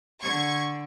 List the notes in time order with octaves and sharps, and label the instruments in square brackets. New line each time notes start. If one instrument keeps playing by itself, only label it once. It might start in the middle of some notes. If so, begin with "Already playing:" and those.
[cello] D3 [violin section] C#6 G#6